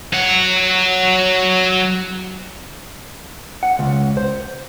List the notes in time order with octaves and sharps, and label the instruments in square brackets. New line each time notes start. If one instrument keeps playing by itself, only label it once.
[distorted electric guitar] F#3 F#5
[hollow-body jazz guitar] F#5
C#2
C5